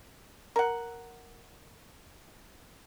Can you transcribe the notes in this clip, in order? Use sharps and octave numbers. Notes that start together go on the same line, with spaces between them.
A#4 F#5